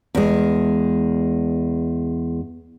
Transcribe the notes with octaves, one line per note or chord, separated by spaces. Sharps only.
E2 G#3